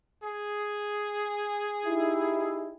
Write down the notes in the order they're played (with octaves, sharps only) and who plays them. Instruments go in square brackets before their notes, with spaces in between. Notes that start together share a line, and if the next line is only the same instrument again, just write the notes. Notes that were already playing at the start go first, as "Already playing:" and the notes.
[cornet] G#4
[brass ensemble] D#4 E4 G4